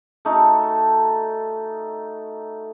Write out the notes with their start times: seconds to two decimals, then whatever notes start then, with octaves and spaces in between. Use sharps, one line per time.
0.25 A3 D#4 F#4 A4